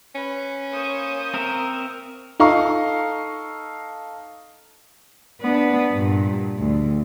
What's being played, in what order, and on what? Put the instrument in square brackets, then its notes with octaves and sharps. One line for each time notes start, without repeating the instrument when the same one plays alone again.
[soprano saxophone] C#4 [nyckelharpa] B4
[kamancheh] A#3 D#6 [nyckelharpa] C5 C#6
[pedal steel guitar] C4 A#4 E5
[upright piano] D#4 A4 F5 A#5 C#6
[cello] B3 D4
G2 A#2
D2